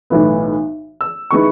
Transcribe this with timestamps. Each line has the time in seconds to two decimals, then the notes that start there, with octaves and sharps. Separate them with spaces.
0.10 B1 A2 E3 B3
1.01 E6
1.31 D#3 G#3 B3 E4 C#6